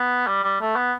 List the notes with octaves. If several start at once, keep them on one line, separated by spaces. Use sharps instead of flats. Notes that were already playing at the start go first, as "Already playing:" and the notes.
Already playing: B3
G3
G3
A3
B3